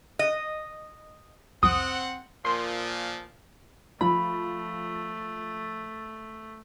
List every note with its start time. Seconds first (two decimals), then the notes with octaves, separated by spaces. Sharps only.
0.19 D#5
1.63 C2 F2 C4 F#5 D#6
2.45 A#2 F3 C6
4.01 F3 A3 B5